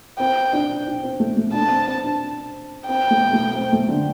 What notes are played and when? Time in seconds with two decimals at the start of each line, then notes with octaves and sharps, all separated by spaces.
0.19 C4 G5
0.53 D4
0.87 D4
1.03 C4
1.20 A3
1.37 A3
1.53 D4 A5
1.70 C4
1.88 C4
2.04 D4
2.88 C4 G5
3.11 A3
3.33 A3
3.56 C4
3.73 A3
3.89 D3